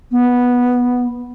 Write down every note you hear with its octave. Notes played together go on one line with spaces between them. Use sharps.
B3